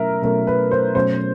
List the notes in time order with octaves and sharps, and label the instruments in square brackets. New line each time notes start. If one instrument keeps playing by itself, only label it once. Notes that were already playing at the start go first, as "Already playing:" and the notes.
Already playing: [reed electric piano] B2 F#3 A3 C#4 [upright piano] A#4 E5
[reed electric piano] B2 F#3 A3 C#4 [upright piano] A#4
[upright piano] B4
C5
[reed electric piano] B2 F#3 A3 C#4 [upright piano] C5